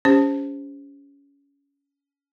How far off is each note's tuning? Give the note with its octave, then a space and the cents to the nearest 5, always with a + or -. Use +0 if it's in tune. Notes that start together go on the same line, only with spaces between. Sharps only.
C#4 +25 G4 +40 C5 +0